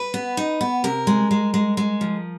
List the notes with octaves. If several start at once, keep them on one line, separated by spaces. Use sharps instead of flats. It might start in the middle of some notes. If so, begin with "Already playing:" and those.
Already playing: B4
B3
D#4
B3
C3 A#4
G#3
G#3
G#3
G#3
F3